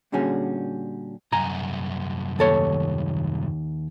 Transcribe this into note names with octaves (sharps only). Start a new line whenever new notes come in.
A#2 D3 G3 C#4 F#4 G#4
C2 F#2 G#5 A#5
D#2 A4 C#5